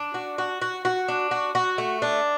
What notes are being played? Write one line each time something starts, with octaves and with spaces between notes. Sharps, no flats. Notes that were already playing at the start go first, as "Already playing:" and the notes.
Already playing: D4
F#4
F#4
F#4
F#4
D4
F#4
F#4
A3
D4